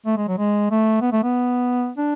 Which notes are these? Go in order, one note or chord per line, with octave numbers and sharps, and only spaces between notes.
A3
G#3
F#3
G#3
A3
B3
A3
B3
D4